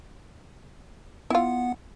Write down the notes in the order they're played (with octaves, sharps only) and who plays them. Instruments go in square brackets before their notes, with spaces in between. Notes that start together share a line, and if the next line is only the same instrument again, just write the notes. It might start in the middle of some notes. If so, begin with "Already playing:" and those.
[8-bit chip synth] B3 F#5 [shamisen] E4 F4